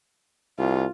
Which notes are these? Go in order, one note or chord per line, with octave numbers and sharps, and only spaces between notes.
C2 F4